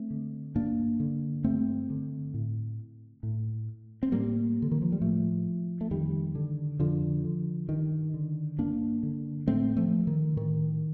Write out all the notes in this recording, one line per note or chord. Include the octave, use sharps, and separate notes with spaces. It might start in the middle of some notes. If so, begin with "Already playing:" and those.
Already playing: A3 C4
D3
G2 A#3 D4
D3
G2 A3 C4
D3
A2
A2
C4
A2 G3 A#3
D3
D#3
F3
G3
A2 F3 A3
A3
F2 D#3 G3
D3
F2 D3 F3
D3
G2 D#3
D3
G2 A#3 D4
D3
A2 A3 C4
F3 A3
D#3
A2 D#3